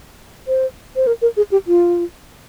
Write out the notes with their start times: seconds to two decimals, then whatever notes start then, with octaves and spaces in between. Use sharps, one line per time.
0.48 C5
0.96 C5
1.07 A#4
1.22 A#4
1.37 G#4
1.52 G4
1.67 F4